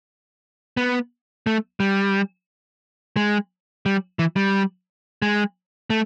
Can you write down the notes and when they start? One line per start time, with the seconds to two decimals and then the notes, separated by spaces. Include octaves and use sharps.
0.77 B3
1.47 A3
1.80 G3
3.16 G#3
3.86 G3
4.19 E3
4.36 G3
5.22 G#3
5.90 A3